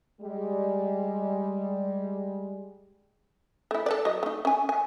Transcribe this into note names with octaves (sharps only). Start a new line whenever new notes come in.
G3 G#3
A3 E4
A4 B4 D5
F#3 D#5
A3 D#4
C#4 G#5
G#5